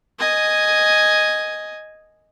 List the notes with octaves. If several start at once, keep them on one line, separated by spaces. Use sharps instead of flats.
D#5 G#5